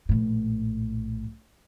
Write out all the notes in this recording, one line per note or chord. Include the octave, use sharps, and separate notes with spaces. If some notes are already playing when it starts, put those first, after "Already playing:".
A#1 A2